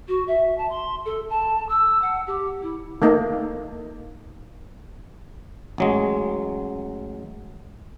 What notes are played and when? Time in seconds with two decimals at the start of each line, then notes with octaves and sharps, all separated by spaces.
0.08 F#4
0.28 E5
0.58 A5
0.70 C6
1.05 A4
1.30 A5
1.69 E6
2.02 F#5
2.27 G4
2.62 E4
3.02 A3 A#3 D#4
5.78 A1 F#3 G#3